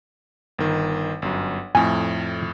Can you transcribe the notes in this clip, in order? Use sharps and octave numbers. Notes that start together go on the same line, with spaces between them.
G1 D#3
G1 F#2
F2 A2 G#5